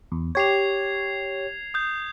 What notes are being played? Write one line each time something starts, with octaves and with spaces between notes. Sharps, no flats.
E2
G4 C#5 G#6 C7 F7
D#6 G6